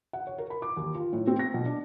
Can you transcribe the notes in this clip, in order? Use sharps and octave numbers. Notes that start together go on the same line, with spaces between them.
F#5
C#5
A#4
B5
D6
D#2
F4
A2
C4
A#6
B2
D4